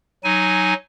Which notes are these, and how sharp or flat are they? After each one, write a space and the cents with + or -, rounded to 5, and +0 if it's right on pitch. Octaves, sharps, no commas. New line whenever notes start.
F#3 +0 D#4 +0 G#5 +0